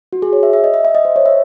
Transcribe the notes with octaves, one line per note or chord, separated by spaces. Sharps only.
F#4
G#4
C#5
E5
E5
D#5
E5
E5
D#5
C5
C#5
E5